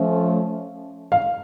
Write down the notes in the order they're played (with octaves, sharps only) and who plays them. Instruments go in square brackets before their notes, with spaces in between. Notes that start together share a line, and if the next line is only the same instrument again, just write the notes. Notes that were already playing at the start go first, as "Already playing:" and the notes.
Already playing: [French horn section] F3 A3 C#4
[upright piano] F5